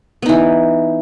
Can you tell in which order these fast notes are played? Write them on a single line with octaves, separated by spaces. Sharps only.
B3 D#4 E3